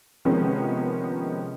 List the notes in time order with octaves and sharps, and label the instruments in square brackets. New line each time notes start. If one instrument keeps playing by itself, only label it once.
[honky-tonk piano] C3 D#3 F3 G#3 B3 C#4